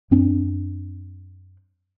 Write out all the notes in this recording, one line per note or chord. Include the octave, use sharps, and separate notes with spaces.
F#2 C4 D4